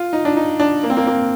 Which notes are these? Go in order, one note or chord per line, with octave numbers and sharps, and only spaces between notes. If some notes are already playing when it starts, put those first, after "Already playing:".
Already playing: F4
D#4
D4
D#4
D4
A#3
C4
A#3
A#3